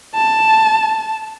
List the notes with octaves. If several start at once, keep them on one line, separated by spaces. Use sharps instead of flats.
A5